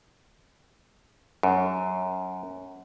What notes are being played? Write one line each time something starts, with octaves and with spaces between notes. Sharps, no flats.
F#2